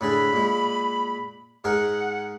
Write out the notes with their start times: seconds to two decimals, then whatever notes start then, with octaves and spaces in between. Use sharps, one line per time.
0.01 A2 D3 G#4 B5
0.33 A#2 G#3
1.64 G#2 G#4 A#4 F#5